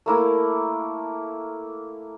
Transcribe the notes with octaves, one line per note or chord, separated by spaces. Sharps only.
A3 A#3 E4